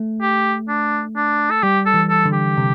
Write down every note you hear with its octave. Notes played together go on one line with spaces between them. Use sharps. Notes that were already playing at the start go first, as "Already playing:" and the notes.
Already playing: A3
G4
D4
D4
A4
G3 G4
A4
E3
A4
D3
G4
C3